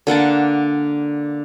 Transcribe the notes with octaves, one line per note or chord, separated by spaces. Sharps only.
D3 A#3 F#5 A5